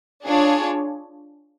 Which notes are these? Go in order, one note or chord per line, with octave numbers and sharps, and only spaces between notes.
D4 F4 G#4 C#5